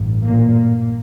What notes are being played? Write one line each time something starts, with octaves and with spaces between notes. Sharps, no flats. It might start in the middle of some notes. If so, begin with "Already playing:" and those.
Already playing: A1 G2
A#2 A#3